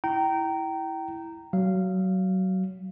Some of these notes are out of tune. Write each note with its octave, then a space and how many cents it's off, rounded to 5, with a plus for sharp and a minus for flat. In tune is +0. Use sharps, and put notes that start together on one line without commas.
E4 +0 G5 -25 A#5 -10
F#3 +20 F5 -15